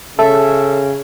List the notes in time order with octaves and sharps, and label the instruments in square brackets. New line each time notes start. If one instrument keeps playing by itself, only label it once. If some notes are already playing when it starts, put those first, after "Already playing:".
[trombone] C#3 [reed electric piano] A4 [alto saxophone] E5